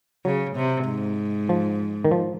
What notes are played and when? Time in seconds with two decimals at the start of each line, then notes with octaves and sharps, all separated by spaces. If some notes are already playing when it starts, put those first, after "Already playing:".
0.25 C#3 F#3
0.56 C3
0.87 G#2
1.49 F3
2.05 D#3
2.11 F3